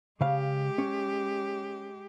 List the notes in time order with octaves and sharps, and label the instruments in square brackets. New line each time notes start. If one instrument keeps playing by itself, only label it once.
[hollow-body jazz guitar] C#3 F5 [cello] G#3 G4
[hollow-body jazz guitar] C#4